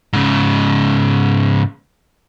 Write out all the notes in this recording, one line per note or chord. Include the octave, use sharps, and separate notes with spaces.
G#2 C#3